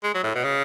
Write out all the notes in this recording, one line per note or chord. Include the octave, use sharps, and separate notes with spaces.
G#3
F#3
A2
B2
C#3